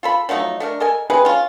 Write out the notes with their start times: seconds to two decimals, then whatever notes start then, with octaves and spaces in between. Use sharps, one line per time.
0.03 F4 A4 B5
0.29 F3 F#3 A3 D#4
0.60 A3 D4 A#4
0.80 A4 A#4 D#5 G#5
1.10 C3 G#3 G#4 B4
1.25 C#4 F4